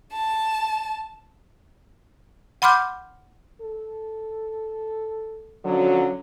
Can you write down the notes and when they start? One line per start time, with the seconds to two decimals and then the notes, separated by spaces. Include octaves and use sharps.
0.12 A5
2.62 F#5 B5 C6 D6 F6 G6
3.61 A4
5.64 D3 F3 F#3 C#4